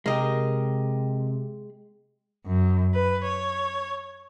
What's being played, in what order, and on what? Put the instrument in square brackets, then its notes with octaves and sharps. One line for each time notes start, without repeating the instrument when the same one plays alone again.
[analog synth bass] C3 [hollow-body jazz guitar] G#3 G4 [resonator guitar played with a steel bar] A#4 D#5
[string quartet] F#2
B4
C#5